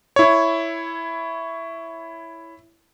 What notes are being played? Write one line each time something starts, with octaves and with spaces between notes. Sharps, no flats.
E4 C#5